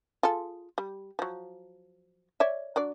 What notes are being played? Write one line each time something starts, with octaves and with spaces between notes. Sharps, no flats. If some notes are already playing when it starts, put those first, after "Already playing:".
F4 G#4 A4
G3
F3 F#3
C#5 D5 E5
F#3 D4 D5